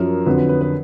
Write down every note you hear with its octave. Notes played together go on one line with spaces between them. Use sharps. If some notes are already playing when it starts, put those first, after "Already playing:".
Already playing: F#2 F3 A#4
F2 D3 F#3 B4
B4
B4
B4